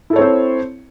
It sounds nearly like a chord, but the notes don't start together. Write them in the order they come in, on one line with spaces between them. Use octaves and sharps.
E4 A4 C#5 C4 C5